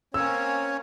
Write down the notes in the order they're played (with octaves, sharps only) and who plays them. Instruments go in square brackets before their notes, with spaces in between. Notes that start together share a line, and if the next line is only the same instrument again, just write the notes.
[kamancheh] A#3 C4 [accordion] C#4 C#5 [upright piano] E6